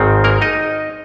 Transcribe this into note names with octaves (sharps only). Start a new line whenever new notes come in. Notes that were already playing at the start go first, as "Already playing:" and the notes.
Already playing: G#1 G#2 D#3 C4
A#3 A#4
D#4 D#5